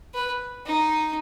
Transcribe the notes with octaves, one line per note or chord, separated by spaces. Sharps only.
B4
D#4